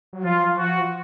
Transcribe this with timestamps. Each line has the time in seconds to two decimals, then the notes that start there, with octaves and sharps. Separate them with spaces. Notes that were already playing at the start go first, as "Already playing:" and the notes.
0.13 F#3
0.25 F3 F4
0.58 F#4